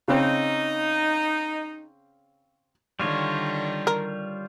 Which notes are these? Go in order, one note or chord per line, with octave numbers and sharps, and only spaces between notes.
C#3 C4 D#4
D3 D#3 G3 F4 C#5
A#4